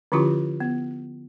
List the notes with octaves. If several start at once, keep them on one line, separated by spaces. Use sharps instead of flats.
D3 F3 C#4 E4 F4 G4
B3